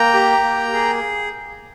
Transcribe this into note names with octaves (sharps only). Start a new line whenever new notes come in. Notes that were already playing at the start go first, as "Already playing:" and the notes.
Already playing: A#3 G5 A#5
G4
A#3
G#4